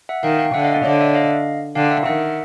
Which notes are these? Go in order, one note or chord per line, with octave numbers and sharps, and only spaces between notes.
E5 F#5
D#3 F5 G5
F5 G5
D3 E5 F#5
D#5 F5
D5 E5
D3 C#5 D#5
D5 E5
D#5 F5
D3 F5 G5
E5 F#5
D#3 E5 F#5